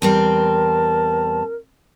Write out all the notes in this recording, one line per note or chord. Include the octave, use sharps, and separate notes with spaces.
E2 G3 C4 A#4 A5